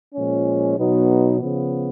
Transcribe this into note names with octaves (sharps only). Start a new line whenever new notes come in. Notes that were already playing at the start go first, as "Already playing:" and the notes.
A#2 F3 G#3 C#4
B2 F#3 B3 D#4
C#3 F3 B3